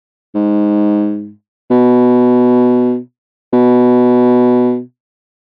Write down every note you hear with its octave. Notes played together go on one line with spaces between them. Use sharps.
G#2
B2
B2